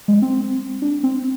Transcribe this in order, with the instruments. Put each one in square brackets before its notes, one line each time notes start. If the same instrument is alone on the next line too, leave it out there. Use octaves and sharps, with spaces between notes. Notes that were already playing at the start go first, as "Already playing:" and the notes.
[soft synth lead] G#3
C4
D4
C4